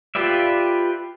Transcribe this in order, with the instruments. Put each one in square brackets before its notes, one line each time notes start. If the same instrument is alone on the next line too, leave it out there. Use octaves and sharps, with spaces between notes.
[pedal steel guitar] F4 G4 B4 D5 E5